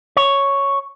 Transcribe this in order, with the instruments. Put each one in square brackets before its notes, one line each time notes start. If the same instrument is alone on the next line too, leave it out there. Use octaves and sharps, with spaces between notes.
[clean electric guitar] C#5